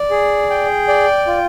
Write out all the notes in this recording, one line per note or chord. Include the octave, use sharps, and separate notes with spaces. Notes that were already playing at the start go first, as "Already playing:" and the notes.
Already playing: D5
G#4
G5
D5
F4